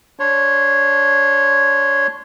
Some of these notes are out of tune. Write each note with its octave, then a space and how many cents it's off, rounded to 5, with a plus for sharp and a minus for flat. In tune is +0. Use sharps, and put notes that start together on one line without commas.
D4 -15 C#5 -5 C6 -20